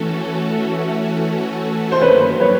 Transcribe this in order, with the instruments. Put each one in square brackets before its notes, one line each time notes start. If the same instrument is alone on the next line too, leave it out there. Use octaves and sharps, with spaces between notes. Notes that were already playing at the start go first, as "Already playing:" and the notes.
Already playing: [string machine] E3 A3 C#4 F#4 A4
[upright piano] C5
[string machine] G2 D#3 F#3 A#3 [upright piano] B4 C#5
[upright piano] B4 C#5